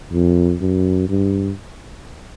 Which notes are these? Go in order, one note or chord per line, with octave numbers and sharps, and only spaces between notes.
F2
F#2
G2